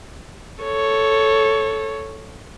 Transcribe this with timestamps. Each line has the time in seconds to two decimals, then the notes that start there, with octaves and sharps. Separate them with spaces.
0.64 A4 C#5